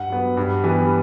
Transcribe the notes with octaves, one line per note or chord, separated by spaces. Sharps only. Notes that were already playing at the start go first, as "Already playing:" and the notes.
Already playing: G2 F#5
F#3 B3
G2
E3 G3 B3